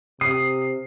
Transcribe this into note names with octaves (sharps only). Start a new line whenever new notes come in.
C3 D#6 C7